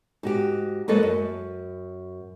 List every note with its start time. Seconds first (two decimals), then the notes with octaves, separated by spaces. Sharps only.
0.23 G#2 F#4 G4
0.88 F#3 G#3 A#3 A4 B4 C5
1.03 F#2